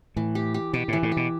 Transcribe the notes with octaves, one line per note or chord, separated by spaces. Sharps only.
A2 E3
G4
G4
B2 G4
A2 E3
A2
G4
B2